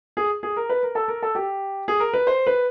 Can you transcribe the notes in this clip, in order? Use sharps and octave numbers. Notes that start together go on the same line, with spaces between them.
G#4
G#4
A#4
B4
A#4
A4
A#4
A4
G4
G#4
A#4
B4
C5
B4